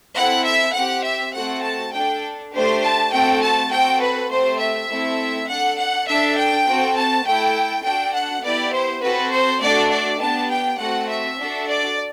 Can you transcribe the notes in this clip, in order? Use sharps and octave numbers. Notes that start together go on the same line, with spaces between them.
C4 E4 A4 F#5
E5
C4 G4 F#5
E5
A3 C4 F#4 A4 F#5
A5
D4 A4 G5
A3 D4 G4 C5
A5
A3 C4 F#4 A4 G5
A5
C4 F#4 A4 G5
B4
A3 C4 G4 C5
E5
A3 C4 E4 A4
D4 A4 F#5
F#5
D4 A4 E5
G5
C4 F#4 A4
A5
A3 E4 A4 G5
D4 F#4 A4 G5
F#5
B3 E4 G4 D5
C5
C4 F#4 A4 B4
C5
A3 D4 F#4 A4 D5
D5
B3 D4 G4 A5
G5
A3 C4 F#4 F#5
E5
D4 F#4 A4
D5